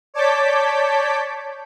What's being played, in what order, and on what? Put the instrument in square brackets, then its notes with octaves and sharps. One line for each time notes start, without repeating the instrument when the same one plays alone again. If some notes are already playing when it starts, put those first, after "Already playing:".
[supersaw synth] C#5 D5 A5 D6 G6 B6